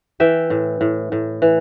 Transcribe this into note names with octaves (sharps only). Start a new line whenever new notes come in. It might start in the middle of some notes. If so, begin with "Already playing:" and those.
E3 E5 G5
A2
A2
A2
E3